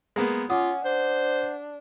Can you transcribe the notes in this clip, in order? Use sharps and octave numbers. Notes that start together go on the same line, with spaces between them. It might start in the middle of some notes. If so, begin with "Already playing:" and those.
G#3 A#3 B3
C#4 F4 F#5 D6 D#6
D4 C5